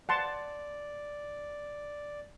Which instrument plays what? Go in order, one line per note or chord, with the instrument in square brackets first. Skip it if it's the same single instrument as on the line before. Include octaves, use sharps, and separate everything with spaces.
[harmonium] D5 [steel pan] F#5 A5 C6